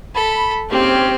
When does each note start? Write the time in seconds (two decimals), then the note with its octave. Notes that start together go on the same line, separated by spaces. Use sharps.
0.15 A4 B5
0.71 G#2 A#3 C4 C#4 G4